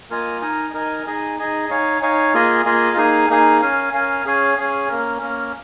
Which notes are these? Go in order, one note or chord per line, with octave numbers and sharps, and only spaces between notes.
A#3 F4 A#4 D#5 G#5
D#4 A#4 D#5 G#5
D#4 A#4 D#5 G#5
D#4 G#4 D#5 G#5
D#4 G#4 D#5 G#5
D#4 C#5 F5 G#5
D#4 C#5 F5 G#5
A#3 F4 G#4 D#5 G#5
A#3 F4 G#4 D#5 G#5
A#3 D#4 G#4 F5 G#5
A#3 D#4 G#4 F5 G#5
C#4 A#4 F5 G#5
C#4 A#4 F5 G#5
C#4 G#4 C#5 F5 G#5
C#4 G#4 C#5 F5 G#5
A#3 C#4 A#4
A#3 C#4 A#4